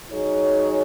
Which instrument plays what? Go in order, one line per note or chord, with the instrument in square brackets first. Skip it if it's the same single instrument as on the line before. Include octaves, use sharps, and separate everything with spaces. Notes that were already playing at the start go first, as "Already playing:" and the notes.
[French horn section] F#3 D#4 G#4 C#5